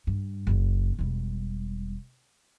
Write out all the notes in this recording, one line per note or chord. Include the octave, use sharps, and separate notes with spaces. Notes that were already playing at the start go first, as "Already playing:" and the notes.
G2
F#1 C#3
E1 G3